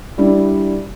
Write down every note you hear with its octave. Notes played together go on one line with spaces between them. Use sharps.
G3 D4 E4